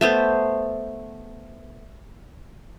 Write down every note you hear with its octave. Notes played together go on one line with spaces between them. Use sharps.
A3 B3 C5